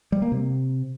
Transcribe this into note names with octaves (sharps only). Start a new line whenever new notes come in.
G3
A#3
C3